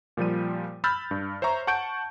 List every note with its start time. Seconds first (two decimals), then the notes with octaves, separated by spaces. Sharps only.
0.17 A#2 F3 G3 D#7
0.84 B5 E6 F6 G6 A6
1.11 G2
1.42 C5 C#5 E5 A#5 C#6
1.67 F#5 A5 C#6 G6 D7